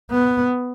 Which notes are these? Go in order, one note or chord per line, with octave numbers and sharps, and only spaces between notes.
B3